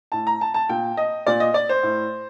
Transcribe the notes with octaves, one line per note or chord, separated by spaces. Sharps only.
A2 A5
A#5
A5
A5
A#2 G5
D#5
A#2 D5
D#5
D5
C5
A2